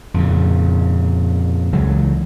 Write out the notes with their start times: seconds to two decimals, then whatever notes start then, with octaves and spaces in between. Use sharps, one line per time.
0.14 F2 A#2 C#3
1.73 C#2 E3 F#3 G#3